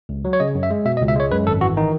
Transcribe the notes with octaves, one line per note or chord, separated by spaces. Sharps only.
C#2
F#3
C#5
C#3 D#5
F#2
E5
G#3
B2 E5
D#5
C#2
E5
G#3 C#5
F#2 B4
G#1 A4
E3 F#4
D#3 D#4